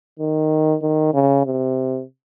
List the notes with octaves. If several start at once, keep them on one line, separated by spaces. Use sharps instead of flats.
D#3
D#3
C#3
C3